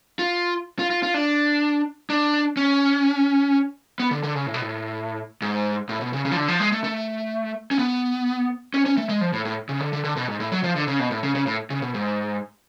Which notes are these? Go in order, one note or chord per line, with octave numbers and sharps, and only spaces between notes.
F4
F4
F4
F4
D4
D4
C#4
B3
D3
D3
C#3
A2
B2
A2
G#2
A2
B2
C#3
C#3
F3
D3
F3
G#3
A3
A3
C#4
B3
C#4
C#4
A3
G#3
F3
A2
A2
C#3
D3
D3
D3
B2
G#2
A2
F#3
F3
D3
C#3
B2
A2
C#3
C#3
A2
C#3
B2
G#2